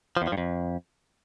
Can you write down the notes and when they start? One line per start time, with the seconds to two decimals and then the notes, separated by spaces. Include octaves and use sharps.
0.17 F3
0.22 E2
0.27 F3
0.32 G2
0.38 F2